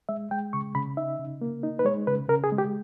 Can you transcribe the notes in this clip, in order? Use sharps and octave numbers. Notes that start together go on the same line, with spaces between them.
G#3 E5
G#3 G5
C#3 C#6
C#3 B5
D#4 E5
C#3
A#3
D#4
B4
G#3 C#5
C#3 B4
C#3 A#4
G#4
G#3
G4